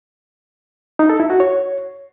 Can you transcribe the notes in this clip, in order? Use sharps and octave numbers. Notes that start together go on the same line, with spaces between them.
D#4
A4
E4
F#4
C#5